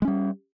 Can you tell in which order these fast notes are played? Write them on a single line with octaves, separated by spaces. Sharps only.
G#3 C#4 G3